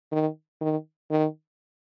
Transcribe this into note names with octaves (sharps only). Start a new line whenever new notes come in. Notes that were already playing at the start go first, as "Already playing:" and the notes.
D#3
D#3
D#3